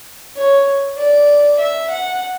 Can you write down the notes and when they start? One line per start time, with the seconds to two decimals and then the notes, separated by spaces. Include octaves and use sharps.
0.37 C#5
0.97 D5
1.58 E5
1.89 F#5